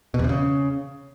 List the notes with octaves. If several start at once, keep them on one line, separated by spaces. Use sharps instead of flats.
B2
E2
C3
C#3